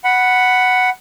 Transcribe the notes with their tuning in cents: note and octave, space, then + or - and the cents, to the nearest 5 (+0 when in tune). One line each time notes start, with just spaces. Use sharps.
F#5 +5 B5 +0